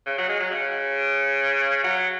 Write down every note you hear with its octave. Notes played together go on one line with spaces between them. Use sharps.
C#3
F#3
G#3
F#3
C#3
F#3